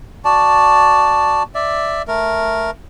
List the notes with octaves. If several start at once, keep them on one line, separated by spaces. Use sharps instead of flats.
F#4 D5 A5
D5 E5
A3 A#4